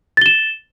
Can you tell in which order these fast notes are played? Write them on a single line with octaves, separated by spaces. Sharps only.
A6 G7 E7